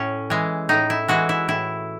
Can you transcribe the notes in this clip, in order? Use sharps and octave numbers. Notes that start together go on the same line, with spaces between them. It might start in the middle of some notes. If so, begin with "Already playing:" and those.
Already playing: A2 C#4
E3 G#3
A2 D#4
E4
E3 G#3 F#4
E4
A2 E4